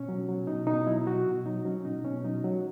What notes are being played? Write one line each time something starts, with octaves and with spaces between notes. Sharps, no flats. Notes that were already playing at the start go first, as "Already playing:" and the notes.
Already playing: B2 C#4
F#3
F#3
B2 D#4
B2 D#4
F#3 E4
F#3 F#4
B2
F#3 D#4
F#3 C#4
B2 D#4
B2 C#4
F#3 D#4
F#3